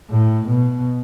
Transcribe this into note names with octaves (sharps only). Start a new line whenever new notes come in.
A2
B2